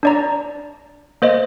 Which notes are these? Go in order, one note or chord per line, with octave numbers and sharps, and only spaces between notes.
D4 D5 A#5
A#3 C5 D#5